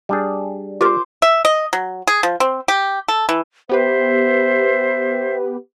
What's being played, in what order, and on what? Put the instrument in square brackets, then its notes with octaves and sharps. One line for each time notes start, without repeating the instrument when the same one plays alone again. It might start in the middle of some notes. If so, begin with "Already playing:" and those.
[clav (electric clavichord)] G3 D4 G#4
[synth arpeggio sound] F4 G4 A#4 [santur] C5 D6
[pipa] E5
D#5
F#3
G#4
F3
C4
G4
A4
E3
[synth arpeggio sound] B3 G4 B4 [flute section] C5 E5